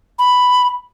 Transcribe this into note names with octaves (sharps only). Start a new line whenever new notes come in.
B5